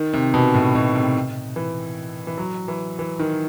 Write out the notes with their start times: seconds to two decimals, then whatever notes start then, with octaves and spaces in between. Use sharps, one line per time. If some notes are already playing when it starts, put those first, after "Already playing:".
Already playing: D#3
0.13 C3
0.34 B2
0.54 A2
0.75 B2
0.95 C3
1.56 E3
2.27 E3
2.38 F#3
2.68 E3
2.99 E3
3.19 D#3